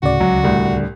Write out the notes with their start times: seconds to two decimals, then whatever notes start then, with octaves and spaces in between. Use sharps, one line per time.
0.03 D2 A2 C#3 F#4 D5
0.20 C#2 F#3
0.44 C2 A2 D3